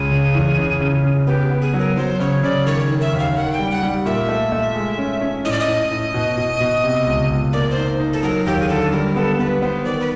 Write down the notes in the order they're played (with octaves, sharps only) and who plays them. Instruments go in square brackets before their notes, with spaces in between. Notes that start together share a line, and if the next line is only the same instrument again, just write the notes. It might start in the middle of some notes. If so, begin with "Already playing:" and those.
Already playing: [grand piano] C#2 C#3 [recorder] G#4
[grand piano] C#3
E2
C#3
C#3
C#3
[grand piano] B3 [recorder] G4
[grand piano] B3
[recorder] G#4
[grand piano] F#3
[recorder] A#4
[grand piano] F#3 [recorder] C5
[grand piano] C#3 [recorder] C#5
[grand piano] C#3 [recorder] D5
[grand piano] D#3 [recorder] C#5
[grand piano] D#3
[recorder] E5
[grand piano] D#2
[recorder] F5
[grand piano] D#3 [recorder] F#5
[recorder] G5
[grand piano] G3
[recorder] F#5
[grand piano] G3
[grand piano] A#2 [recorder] E5
[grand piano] A3
A3
G#3
C#4
C#4
[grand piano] A2 [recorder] D#5
[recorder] D5
D#5
[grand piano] A2
A2
B2
B2
B2
C3
C#2
C#2
[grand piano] A#3 [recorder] D5
[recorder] C5
[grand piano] D#4
D#4
[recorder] A4
[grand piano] F#3 [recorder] A#4
[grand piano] D#2 [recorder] G4
[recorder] G#4
[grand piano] D3 [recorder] A4
[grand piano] G3 [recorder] A#4
[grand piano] B3 [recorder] A4
[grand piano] B3 [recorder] B4
[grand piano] B3 [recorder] C5
[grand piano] D#3 [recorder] D5
[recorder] B4